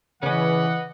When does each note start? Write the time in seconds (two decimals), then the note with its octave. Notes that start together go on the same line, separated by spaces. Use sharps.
0.23 C#3 E3 C#4 B4 D#5 F#5